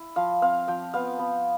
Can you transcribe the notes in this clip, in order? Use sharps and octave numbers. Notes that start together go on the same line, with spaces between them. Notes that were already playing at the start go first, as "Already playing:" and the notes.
Already playing: E4
F3 F5
C4 F5
F3 G5
B3 F5
B3